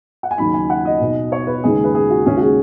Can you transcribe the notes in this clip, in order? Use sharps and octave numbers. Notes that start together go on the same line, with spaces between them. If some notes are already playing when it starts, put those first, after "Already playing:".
F#5
G#5
D#2 C#3 F#3 D#4 B5
G#5
F#5
D#5
B2 B3 D#4
C#5
B4
D#2 C#3 G#3 D#4 G#4
B4
G#4
F#4
D#2 C#3 G#3 C#4 G#4
F#4
G#4